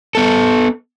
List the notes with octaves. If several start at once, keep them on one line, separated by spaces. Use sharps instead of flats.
B3 A4